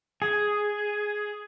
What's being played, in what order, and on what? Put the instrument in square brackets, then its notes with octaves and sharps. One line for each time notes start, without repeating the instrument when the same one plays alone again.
[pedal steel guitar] G#4